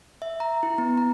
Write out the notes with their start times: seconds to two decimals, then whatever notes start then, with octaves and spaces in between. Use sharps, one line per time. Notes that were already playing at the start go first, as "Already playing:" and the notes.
0.22 E5
0.40 A#5
0.63 E4
0.78 B3
0.97 A#5